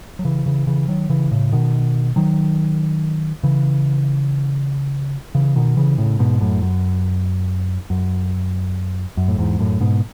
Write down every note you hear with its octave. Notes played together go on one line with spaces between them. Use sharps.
F#3
C#3 E3
C#3 E3
C#3 E3
D#3 F#3
C#3 E3
A2 C#3
B2 D#3
D#3 F#3
C#3 E3
C#3 E3
B2 D#3
C#3 E3
A2 C#3
G#2 B2
F#2 A2
F#2
F#2
F#2
A2
E2 G#2
F#2 A2
G#2 B2